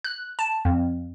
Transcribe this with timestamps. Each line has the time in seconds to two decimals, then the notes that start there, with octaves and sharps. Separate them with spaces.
0.04 F#6
0.39 A5
0.65 F2